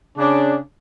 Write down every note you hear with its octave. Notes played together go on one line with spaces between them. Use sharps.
C#3 D4